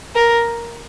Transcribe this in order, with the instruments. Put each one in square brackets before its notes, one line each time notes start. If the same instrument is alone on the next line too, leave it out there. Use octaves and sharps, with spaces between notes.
[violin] A#4